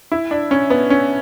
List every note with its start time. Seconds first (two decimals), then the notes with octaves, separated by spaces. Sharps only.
0.12 E4
0.31 D4
0.51 C#4
0.70 B3
0.90 C#4